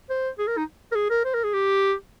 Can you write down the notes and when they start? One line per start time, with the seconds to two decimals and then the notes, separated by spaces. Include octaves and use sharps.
0.10 C5
0.39 G#4
0.48 A#4
0.57 D#4
0.92 A#4
0.95 G#4
1.10 A#4
1.25 C5
1.34 A#4
1.44 G#4
1.53 G4